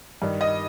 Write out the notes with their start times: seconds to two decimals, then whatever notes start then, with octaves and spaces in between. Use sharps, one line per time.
0.22 G2 D#3 G3
0.41 D#5